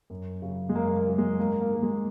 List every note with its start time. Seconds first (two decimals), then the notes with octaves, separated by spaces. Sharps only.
0.10 F#2
0.42 C#3 F#3
0.69 G#3
0.75 F#2 A#3
0.96 A#3
1.07 C#3 F#3
1.18 G#3
1.39 G#2 A#3
1.61 A#3
1.71 D#3 G#3
1.82 G#3